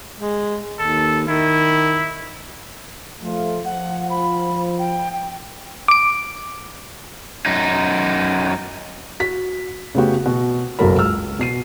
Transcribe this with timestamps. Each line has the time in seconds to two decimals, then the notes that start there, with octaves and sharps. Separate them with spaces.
0.20 G#3
0.79 D#2 A4
1.28 D#3 E4
3.22 F3 A3 F4
3.65 F3 F#5
4.10 B5
4.78 G5
5.13 G5
5.88 D6 D7
7.46 F#2 D#4
9.20 F#4 B6
9.95 C#3 A3 B3 F#4 G4
10.26 B2 F#4
10.79 F#1 B1 F#3 A4 A#4 B5
10.98 C#2 E6 F6
11.39 B2 C7 D#7